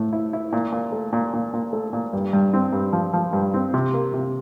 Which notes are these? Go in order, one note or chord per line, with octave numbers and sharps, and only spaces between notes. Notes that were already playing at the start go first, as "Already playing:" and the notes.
Already playing: A2 E4
E4
E4
A#2
A#2
A3
A#2
A#2
A#2
A3
A#2
G2
G2
C4
G2
F3
F3
G2
C4
C3
A#3
C3